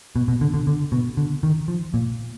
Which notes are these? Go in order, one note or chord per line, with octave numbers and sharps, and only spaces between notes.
B2
B2
D3
D3
D3
B2
D3
D#3
F3
A#2